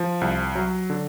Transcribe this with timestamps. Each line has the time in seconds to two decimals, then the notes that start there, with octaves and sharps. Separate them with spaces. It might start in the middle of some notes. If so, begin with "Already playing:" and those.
Already playing: F3
0.21 C2
0.55 F#3
0.90 D3